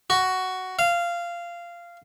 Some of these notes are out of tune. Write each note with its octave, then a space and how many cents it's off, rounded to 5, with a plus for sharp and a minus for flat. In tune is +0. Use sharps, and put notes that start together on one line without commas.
F#4 +10
F5 -15